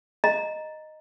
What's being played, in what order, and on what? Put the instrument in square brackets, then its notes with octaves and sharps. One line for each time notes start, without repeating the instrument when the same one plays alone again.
[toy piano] D#5 A#5